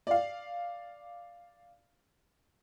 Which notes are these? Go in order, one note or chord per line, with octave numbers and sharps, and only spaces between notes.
D5 F5